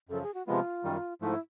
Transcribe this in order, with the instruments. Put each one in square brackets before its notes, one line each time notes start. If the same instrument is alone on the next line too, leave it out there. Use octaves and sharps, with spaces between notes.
[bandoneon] F#2 C#3 F3 [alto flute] A4
[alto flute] G#4
F#4
[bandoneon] C3 F3 G#3 B3 [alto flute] F4
[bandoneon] F#2 D#3 G3
[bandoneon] G#2 F3 A3 [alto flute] E4